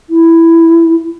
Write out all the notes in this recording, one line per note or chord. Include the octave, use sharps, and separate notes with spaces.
E4